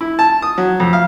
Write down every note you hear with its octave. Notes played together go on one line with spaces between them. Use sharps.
E4
A5
D#6
F#3
F2
F5